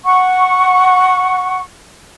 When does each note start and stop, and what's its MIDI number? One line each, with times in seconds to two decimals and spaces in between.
0.05 1.61 78
0.05 1.61 85